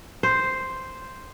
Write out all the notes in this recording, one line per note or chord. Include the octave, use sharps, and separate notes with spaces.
C5